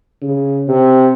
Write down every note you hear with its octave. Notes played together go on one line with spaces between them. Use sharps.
C#3
C3